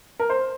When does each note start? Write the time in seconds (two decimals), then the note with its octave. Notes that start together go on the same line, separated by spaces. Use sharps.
0.19 A#4
0.30 C5